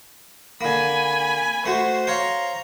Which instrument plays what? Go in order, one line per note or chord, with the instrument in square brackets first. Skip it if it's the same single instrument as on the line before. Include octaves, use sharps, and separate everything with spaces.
[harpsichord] D3 A#3 [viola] G#5 B5
[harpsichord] A3 F#4 [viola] C5
[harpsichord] C5 C#5 F5 [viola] A#5